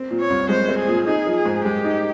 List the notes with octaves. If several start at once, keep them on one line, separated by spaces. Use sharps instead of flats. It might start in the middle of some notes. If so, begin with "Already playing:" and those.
Already playing: C4
A#2
C#5
C2
G#3 C5
C4
G#4
A#2
D#4 G#4
F3
G#4
G#2
G#3 G4
D#4